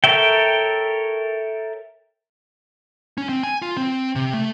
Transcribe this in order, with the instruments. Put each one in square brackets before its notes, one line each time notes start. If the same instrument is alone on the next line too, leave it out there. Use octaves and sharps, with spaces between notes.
[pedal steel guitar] A4 A#4 C#5 E5 G5
[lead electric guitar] C#4
C4
G#5
F4
C4
C3
A3